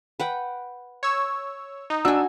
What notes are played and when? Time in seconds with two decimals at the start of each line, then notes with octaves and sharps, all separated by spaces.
0.20 B4 F#5 G5
1.03 C#5 E6
1.90 D#4
2.05 D4 F#4 G#5 E6